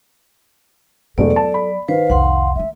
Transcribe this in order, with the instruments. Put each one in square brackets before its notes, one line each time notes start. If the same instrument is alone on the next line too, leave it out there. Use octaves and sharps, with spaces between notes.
[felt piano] E1 G#3 A3 [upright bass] F#3 [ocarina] A4 [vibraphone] D5
[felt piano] A5
B5
[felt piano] D#3 [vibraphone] B4 C5 [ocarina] F5
[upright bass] C2 F2 [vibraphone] F#5 C6
[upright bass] A3 A#3 [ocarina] E5